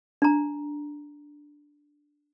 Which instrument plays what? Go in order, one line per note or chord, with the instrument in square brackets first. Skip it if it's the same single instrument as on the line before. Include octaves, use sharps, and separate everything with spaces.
[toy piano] D4 A#5